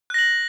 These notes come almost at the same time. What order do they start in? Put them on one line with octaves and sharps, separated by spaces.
F#6 A#6 F#7